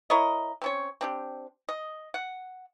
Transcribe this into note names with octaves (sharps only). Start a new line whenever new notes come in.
E4 A#4 C#5 D#5
C4 C#4 C#5
C4 D4 G4
D#5
F#5